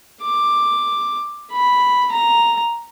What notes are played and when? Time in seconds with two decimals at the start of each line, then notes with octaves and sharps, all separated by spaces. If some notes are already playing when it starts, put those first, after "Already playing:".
0.22 D6
1.52 B5
2.11 A#5